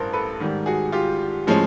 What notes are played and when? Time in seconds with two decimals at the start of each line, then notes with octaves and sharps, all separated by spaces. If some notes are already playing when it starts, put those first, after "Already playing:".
Already playing: A1 G2 A#4 C5
0.13 A4 B4
0.40 G#2 D#3 G3
0.66 F#4 G#4
0.92 F4 G4
1.47 A2 F3 G#3 C#4